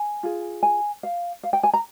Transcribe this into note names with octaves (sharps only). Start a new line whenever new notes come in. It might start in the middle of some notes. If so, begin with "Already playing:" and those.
Already playing: G#5
F4 G#4
G#5
F5
F5
G5
G#5
A#5